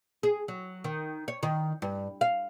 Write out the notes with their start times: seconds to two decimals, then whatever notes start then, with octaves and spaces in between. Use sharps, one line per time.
0.23 G#4
0.48 F#3
0.84 D#3
1.28 C#5
1.43 D#3
1.82 G2
2.21 F5